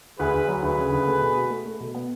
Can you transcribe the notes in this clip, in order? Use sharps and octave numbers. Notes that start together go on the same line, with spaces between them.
D2 G#4 B4
D2
F#3
D2 G#4 B4
C#3
D2
A3
B2
F#4
A3
A3
B2
B3